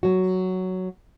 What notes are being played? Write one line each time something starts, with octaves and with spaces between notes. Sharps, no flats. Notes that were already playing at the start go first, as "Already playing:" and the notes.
F#3 F#4